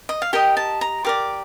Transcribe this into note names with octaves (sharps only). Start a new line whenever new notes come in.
D#5
F5
G4 A#4 D#5 G5
A5
A#5
G4 A#4 D5 D6